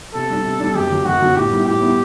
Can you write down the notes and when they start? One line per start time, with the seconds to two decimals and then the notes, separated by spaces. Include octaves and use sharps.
0.14 C3 A4
0.30 G3 D4
0.45 C3
0.60 G3 D4
0.75 F#2 G4
0.90 D3 F#3
1.05 F#2 F#4
1.21 D3 F#3
1.36 A2 G4
1.51 G3 B3 E4
1.67 A2 G4
1.82 G3 B3 E4